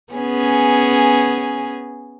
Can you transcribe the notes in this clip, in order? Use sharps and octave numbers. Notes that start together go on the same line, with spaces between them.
B3 C#4 G#4